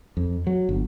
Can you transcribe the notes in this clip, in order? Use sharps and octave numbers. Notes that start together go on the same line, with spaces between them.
F2
F#3
G1